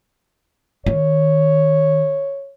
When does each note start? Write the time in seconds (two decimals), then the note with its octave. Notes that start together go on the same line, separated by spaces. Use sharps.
0.86 D#3 C#5